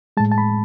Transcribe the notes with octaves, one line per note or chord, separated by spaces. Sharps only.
A2 G#3 A5
A5
B5